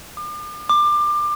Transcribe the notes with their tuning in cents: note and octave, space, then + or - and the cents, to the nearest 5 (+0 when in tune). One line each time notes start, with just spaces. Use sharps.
D6 +45
D6 +25